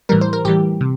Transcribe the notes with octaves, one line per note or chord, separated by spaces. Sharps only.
A2 E3 G3 A#4
C5
A#4
A2 E3 G3 G4
C3